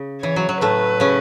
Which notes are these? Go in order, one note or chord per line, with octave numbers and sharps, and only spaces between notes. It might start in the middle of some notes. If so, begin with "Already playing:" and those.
Already playing: C#3
E3 C#5
F#3
F#3
A2 A3 B4
C#3 C#4